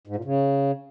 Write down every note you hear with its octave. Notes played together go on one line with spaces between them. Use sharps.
G#2
A#2
C#3